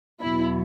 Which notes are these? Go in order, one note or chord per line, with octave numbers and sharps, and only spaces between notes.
E2 B2 F#3 E4